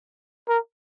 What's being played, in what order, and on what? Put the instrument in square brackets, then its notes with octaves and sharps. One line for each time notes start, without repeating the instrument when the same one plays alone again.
[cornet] A#4